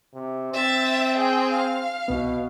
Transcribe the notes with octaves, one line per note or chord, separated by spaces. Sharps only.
C3
C4 E5 A6
G#4 G5
F5
C2 B2 B3